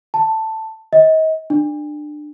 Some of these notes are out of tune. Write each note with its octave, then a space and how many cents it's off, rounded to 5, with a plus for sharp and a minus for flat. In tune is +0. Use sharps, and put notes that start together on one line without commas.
A5 +10
D#5 +35
D4 +25